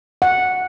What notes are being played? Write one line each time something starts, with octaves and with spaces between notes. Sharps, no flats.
F#5